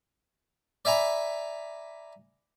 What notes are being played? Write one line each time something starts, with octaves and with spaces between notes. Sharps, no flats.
D5 E5 G#5 A#5 B5